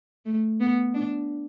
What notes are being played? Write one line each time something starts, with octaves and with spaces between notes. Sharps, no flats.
A3
B3
D4